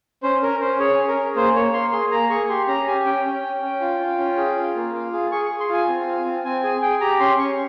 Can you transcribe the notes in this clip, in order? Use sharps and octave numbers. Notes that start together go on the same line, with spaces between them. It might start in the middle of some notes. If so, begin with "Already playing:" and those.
C#4 C5
C#4 A#4
C#4 C5
G#4 C#5
C#4
A#4
G#4
A#3 C5
A#3 C#5
A#3 C6
G#4 C6
A#3 A#5
G#4 C#6
G4 C6
C#4 A#5
G4 G#5
C#4 G5
C#4
C#4
C#4
F4
F4
C#4
G#4
F4
A#3
F4
G#4
G#4 C#6
G#4 C#6
C6
F4 G#5
C4
F4
C4
C4 G#5
G#4 G#5
G#4 G5
G4 A#5
C#4 C6
C#4 C#6